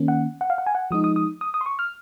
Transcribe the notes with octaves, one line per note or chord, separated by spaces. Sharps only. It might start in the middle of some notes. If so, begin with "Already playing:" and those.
Already playing: D#3 A#3 C#4
F#5
F#5
F5
F#5
G#5
F#5
F3 G#3 D#4 D#6
D#6
D#6
D#6
D#6
C6
C#6
F6